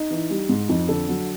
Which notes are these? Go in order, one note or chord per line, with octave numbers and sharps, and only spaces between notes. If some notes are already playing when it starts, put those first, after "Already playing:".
Already playing: D#4
E3
G3
G#2
F2 D#4
D3 A4
F#3